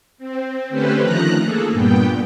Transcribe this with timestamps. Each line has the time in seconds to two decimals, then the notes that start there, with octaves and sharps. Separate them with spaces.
0.18 C4
0.69 D3 A3 C#4 G4 B4 C5
0.99 D#3 F3 A3 A#5 F#6
1.41 A#3 G#4 A4
1.71 G2 A#2 B3 G5